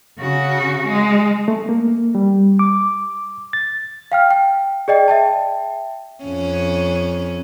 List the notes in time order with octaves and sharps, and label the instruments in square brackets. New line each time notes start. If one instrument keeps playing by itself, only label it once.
[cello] C#3 F#4
G#3
[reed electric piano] A3
A#3
G3
D6
A6
[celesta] F5 G5 F6
G5
G#4 D5 D#5 G5
E5 G5 A5
[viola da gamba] F2 C#4